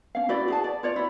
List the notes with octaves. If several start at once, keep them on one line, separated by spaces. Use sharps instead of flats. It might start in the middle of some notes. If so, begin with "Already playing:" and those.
C#4 F5
E4 F#4 D5
F#4 G#4 A5
D5
F4 C#5 D5
E4 F#4